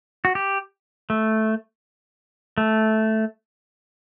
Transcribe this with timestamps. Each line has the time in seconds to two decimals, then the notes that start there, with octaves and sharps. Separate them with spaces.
0.25 F#4
0.35 G4
1.10 A3
2.58 A3